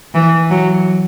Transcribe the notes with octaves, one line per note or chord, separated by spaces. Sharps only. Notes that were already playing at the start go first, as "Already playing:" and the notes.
E3
F#3